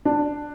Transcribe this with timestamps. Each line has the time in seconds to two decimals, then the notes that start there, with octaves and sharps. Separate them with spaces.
0.05 D4